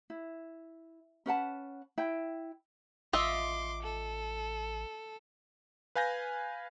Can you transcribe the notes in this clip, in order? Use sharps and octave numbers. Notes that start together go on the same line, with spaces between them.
E4
C#4 B4 F#5 A5
E4 G5
A1 F4 D#5 E5 C6 D6
A4
B4 F5 G#5 G6 A#6